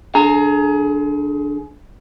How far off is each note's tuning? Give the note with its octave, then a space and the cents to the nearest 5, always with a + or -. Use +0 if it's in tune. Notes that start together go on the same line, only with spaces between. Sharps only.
D3 +0 G#4 +30 A#5 -15